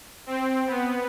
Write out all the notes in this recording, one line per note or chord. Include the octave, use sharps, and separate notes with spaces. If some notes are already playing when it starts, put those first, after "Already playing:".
C4
B3